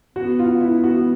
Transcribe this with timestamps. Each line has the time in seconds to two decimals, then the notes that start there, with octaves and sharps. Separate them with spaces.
0.15 B3 F#4
0.39 F4
0.61 E4
0.84 F#4